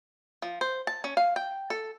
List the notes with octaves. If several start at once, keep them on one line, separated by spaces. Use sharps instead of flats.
F3
C5
A5
C#4
F5
G5
A4